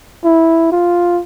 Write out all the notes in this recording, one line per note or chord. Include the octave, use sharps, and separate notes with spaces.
E4
F4